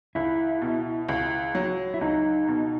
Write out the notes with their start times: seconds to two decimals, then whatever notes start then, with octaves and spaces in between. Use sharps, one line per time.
0.15 C#2 E4
0.62 B2
1.09 C#2
1.55 F#3
1.94 E4
2.01 C#2 D#4
2.48 B2